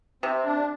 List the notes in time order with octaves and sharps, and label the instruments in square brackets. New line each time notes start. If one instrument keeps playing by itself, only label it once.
[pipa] C3 [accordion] C4
[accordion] D4